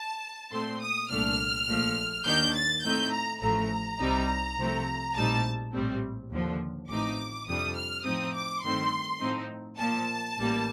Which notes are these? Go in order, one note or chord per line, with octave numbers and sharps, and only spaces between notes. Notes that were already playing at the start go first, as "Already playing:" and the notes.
Already playing: A5
A#2 A3 C4 C6
D#6
C2 A#2 A3 D4 F6
A#1 A#2 F3 A3
D#2 D#3 A#3 D4 G6
A6
A2 A3 C4 D#4 G6
A#5
A1 A2 F3 A3 A#5
C2 C3 G3 C4 D#4
C2 C3 F3 A3 C4
A#1 A2 G3 C4 D#4 A5
A#1 A2 G3 C4
D#2 D3 F3
A1 A2 F3 C4 D#4 D6
F2 C3 G3 D4 D#6
F6
A2 F3 C4 D#4 D#6
D6
G2 D#3 A3 C4 C6
A2 F3 C4 D#4
A#2 F3 A#3 A5
A1 A2 G3 A#3